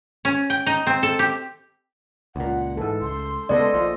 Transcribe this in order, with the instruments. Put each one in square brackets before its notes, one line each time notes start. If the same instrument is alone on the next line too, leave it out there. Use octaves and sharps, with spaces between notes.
[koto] C#4
G5
D#4
C4
A4
G4
[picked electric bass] C#2 A#2 [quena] F#5
[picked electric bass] G#2 E3 [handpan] A4
[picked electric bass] C#2 [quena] C6
[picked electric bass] C#3 G#3 B3 [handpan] A4 D#5 [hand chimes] D5
[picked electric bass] A#1 A#2 F3